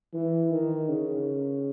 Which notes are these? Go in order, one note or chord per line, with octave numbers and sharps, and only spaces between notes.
E3
D#3
C#3